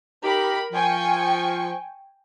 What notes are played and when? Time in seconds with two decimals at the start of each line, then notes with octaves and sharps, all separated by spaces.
0.24 D#4 G4 A#4 B5
0.73 F3 G5 G#5 C#6